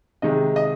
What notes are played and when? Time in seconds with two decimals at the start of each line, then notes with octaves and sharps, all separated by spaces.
0.22 C3 D#3 G#3 D#5
0.56 D#5